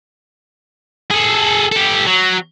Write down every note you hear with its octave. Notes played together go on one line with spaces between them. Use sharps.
G#4 A4
G4 A4
F#3